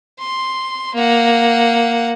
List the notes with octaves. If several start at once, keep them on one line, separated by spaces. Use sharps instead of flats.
C6
A#3 F#5